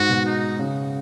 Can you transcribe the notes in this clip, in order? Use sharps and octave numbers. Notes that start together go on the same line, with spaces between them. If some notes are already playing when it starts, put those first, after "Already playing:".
Already playing: G#2 F#4
B2
D#4
C#3